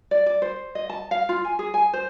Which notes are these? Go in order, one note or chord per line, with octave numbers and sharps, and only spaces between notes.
D5
D5
C5
D#5
A5
F5
F4
G#5
G#4
G#5
C5